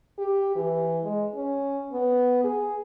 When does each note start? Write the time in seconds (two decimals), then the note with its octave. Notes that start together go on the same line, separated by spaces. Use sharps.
0.18 G4
0.55 E3
1.04 G#3
1.35 C#4
1.92 B3
2.44 G#4